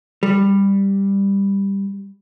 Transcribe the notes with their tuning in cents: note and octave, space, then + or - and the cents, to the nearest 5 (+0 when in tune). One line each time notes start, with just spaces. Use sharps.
G3 +10